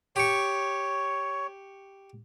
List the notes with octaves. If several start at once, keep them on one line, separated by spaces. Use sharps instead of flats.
G4 C#5 C#6